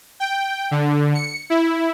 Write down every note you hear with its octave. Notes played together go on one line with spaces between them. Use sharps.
G5
D3
C#7
E4